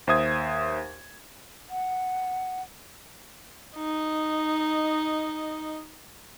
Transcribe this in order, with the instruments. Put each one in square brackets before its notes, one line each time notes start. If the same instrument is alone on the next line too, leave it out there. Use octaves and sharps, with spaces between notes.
[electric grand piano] D#2 C5 E5 D#6 G#6
[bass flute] F#5
[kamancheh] D#4 D#5